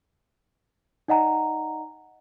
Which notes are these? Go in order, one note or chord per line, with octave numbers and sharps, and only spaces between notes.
D#4 D5 D#5 F#5 G#5 A#5